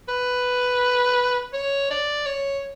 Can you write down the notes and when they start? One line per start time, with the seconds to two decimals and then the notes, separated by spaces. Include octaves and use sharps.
0.09 B4
1.53 C#5
1.90 D5
2.26 C#5